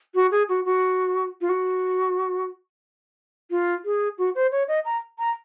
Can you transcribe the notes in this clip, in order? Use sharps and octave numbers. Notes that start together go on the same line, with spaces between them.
F#4
G#4
F#4
F#4
F4
F#4
F4
G#4
F#4
C5
C#5
D#5
A#5
A#5